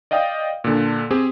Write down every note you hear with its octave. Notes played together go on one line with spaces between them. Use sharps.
D5 D#5 F5 G5 D#6
A#2 D3
C4 G4 G#4